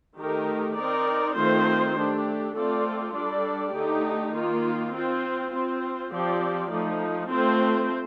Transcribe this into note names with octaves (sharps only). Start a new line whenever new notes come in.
D#3 A3 D#4 G4 A#4
C4 D#4 A#4 D5
D#3 A3 C4 F4 C5
A3 D4 G4
A3 C4 F4 A4 D5
G3 D4 A4 D5
D3 A3 D#4 G4
D#3 A#3 F4
C4 F4 C5
C4 F4 C5
F3 C4 G4 D5
F3 A3 D#4
A3 C4 F4 C5